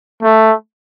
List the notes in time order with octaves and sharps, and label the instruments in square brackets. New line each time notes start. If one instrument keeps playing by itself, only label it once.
[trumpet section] A3